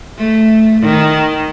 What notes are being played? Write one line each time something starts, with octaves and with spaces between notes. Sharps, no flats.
A3
D#3